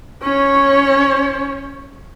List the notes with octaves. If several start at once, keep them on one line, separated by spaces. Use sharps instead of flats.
C#4 C#5